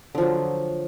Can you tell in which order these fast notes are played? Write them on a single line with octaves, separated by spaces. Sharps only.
D3 F3 F#3